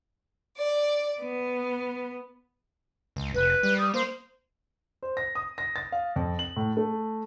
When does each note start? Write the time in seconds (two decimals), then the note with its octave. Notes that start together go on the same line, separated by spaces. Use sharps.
0.56 D5
1.21 B3
3.16 C#2
3.34 F1 B4
3.63 G3
3.78 D#6
3.94 A#3 C5
5.03 C5
5.17 A#6
5.35 D#6
5.58 A#6
5.76 A6
5.92 F5
6.16 F2
6.39 F#7
6.56 A2
6.77 A3